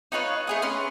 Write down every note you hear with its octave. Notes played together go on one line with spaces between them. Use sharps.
D#4 F4 B4 C#5
A3 G#4 D#6
C#4 B4 C6